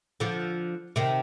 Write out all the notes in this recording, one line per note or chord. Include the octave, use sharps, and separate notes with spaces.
D3 F3
C3 D#3